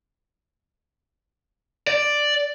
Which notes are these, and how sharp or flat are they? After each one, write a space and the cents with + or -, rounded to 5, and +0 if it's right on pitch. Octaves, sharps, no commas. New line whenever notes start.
D5 +0